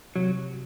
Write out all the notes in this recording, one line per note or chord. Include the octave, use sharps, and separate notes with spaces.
C3 F#3